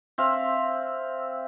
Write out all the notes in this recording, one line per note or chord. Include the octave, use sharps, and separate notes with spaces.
C4 E5 F5